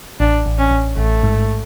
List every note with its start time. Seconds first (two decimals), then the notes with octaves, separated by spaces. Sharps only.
0.20 A1 D4
0.46 A1
0.59 C#4
0.71 A1
0.97 A1 A3
1.23 G#2